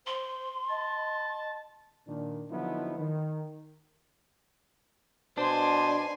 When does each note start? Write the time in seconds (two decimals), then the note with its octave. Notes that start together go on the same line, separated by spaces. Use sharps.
0.07 C5 C6
0.70 D#5 A5
2.07 A#2 D#3 D4
2.50 D3 F3 F#3 B3 D#4 E4
2.98 D#3
5.38 B2 D4 C5 G#5 C6